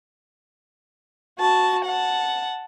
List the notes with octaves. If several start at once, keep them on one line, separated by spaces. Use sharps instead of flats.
F#4 A5
F#5 A5